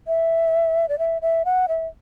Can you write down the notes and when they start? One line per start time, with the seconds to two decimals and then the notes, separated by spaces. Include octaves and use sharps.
0.07 E5
0.89 D5
0.99 E5
1.22 E5
1.45 F#5
1.68 E5